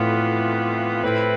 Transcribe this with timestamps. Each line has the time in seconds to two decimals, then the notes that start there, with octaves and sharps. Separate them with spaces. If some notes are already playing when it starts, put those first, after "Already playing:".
Already playing: F2 A2 E3 B3 F4
1.03 A2 F3 C4 E4 B4